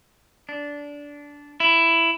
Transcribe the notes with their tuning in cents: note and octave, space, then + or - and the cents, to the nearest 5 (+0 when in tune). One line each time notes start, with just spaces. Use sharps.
D4 -15
E4 +10